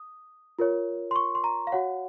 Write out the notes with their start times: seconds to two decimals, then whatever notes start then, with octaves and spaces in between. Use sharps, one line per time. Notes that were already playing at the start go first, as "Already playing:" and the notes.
Already playing: D#6
0.59 F4 A#4 C#5
1.11 C6
1.16 C#6
1.35 C6
1.44 A#5
1.67 F5
1.72 F#4 C#5 F#5